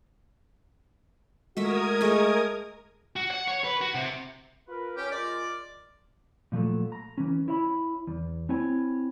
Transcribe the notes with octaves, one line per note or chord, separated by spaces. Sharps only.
G#3 A3 F#4 A#4 E5 D#6 G#6
A3 G#4 D#5
F#4
F#5
C#5
B4
F#4
C3
F4 A#4 B4
C#4 G4
G#3 F4 A#4 D5
A#2 F3 F#3 A3
A#5
E3 C#4
E4 C#5 E5 B5
E2
C4 E4 C#5 G#5